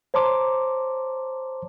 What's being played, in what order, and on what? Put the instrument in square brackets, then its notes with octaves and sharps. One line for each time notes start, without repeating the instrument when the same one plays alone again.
[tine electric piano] C5 C#5 A5 A#5 C6 D6